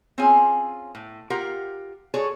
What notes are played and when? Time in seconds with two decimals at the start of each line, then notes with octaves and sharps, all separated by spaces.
0.18 C4 C#4 F4 G#4 G#5
0.95 A2
1.30 F4 G4 A#4 F#5
2.14 F#4 G#4 A4 C#5 D5